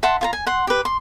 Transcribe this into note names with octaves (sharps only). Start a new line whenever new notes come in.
E5 F#5 A5 C6
F4 G#5 A#5
G#5
F#5 C6
G4 B4
C6